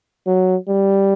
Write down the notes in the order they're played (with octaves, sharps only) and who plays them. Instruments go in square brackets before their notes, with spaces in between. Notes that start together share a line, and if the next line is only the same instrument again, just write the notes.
[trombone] F#3
G3